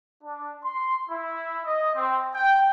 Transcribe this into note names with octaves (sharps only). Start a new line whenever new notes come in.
D4
C6
E4
D#5
C4
G5